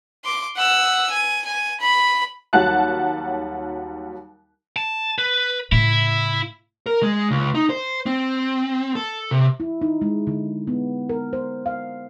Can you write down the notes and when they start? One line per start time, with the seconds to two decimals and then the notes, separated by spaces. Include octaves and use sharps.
0.25 C6 D6
0.56 F#5 E6
1.10 G#5
1.45 G#5
1.80 B5
2.53 D#2 F#3 G3 F#5 A5 F#6
4.76 A5
5.18 B4
5.72 A2 C#3 E4
6.86 A#4
7.02 G#3
7.31 C#2
7.55 D#4
7.70 C5
8.06 C4
8.95 A4
9.31 C3
9.60 E4
9.81 D#4
10.01 G#3
10.27 D3
10.67 B3
11.09 A#4
11.33 C5
11.66 F5